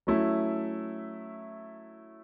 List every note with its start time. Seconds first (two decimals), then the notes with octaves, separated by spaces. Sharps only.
0.07 F#3 A3 C#4 E4